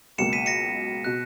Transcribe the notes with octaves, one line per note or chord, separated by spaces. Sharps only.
C#2 B2 F#3 A#3 C#7 E7
B6 D#7
A#6 C#7
B2 F#6